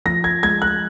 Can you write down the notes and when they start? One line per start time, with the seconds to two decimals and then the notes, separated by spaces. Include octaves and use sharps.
0.05 F3 A#6
0.24 G#6
0.43 G#3 G#6
0.62 F#6